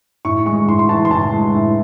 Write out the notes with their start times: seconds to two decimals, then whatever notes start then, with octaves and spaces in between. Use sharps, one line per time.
0.25 A2 C#6
0.46 G#3 C#6
0.68 A2 C6
0.79 C6
0.89 E3 A5
1.05 C6
1.11 A2 A5
1.33 G#3
1.55 A2